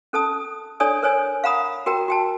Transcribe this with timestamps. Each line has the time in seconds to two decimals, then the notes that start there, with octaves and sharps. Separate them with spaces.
0.13 C#4 A4 A5 D#6
0.80 D4 A4 C#5 D5 G#5 D#6
1.03 A#4 C5 C#5 G#5
1.44 F5 F#5 A#5 B5 D#6
1.86 F#4 A#4 G5 A#5
2.08 F#4 G5 A5